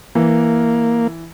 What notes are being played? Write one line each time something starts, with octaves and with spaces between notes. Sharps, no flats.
E3 A#3